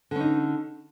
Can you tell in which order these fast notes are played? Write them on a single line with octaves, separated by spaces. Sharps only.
D3 C#4 D#4